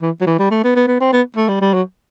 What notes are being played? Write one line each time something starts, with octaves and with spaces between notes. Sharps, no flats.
E3
F#3
E3
G3
A3
B3
B3
B3
C4
B3
A3
G3
G3
F#3